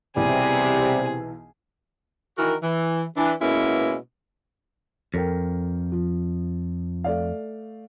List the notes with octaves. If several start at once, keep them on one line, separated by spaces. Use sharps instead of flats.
B1 C3 E3 G3 G#4
D#3 E3 F#4 A#4
E3
E3 D4
B2 G#3 A#3 B3 C#4 E4
F2 A4 A#4 G5
F3
A3 D5 F5